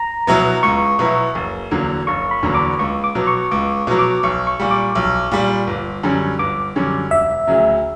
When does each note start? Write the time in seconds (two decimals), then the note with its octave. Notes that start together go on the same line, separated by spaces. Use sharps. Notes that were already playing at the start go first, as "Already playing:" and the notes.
Already playing: A#5
0.27 B2 F#3 B3 E4
0.63 C#2 C#6
0.99 B2 F#3 B3 E4
1.35 F#1
1.71 E2 D3 F#3 A#3
2.07 F#1 C#6
2.31 B5
2.43 E2 D3 F#3 A#3
2.55 D6
2.79 C#2 C#6
3.04 D6
3.15 B2 F#3
3.27 C#6
3.51 C#2 D6
3.87 B2 F#3
3.99 D6
4.23 B1 C#6
4.47 C#6
4.60 A#2 G3
4.71 D6
4.95 B1
5.31 A#2 G3
5.67 G1
6.03 F#2 D3 G3 C#4
6.39 G1 D6
6.76 F#2 D3 G3 C#4
7.11 E1 E5
7.47 D2 C#3 F#3